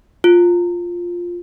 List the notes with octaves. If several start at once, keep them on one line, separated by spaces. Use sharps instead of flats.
F4